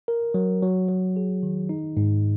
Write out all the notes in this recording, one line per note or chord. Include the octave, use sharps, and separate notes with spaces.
A#4
F#3
F#3
F#3
G#4
D#3
D#4
G#2